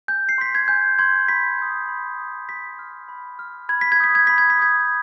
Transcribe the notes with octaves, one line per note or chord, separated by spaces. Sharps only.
G#5 G6
C7
C6 G6 B6
G#6
G#5 G6
C6 G6 G#6
B5 B6
D#6 G6
B5
D#6 G6
B5 B6
F6
B5
F6
B5 G#6
B6
G#6
D#6 G6 B6
G#6
B5 B6
G#6
B6
D#6 G6 G#6